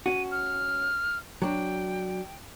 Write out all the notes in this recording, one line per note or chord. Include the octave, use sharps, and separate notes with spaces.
C#4 F#4 D#7
F6
F#3 D4 G5